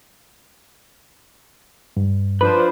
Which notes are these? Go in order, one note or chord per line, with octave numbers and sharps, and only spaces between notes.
G2
F3 D4 B4 C5